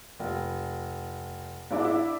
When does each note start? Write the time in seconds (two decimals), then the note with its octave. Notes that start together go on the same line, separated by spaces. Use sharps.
0.19 F1
1.71 G#2 F#3 D4 E4 G#4 D6
1.84 D4 E4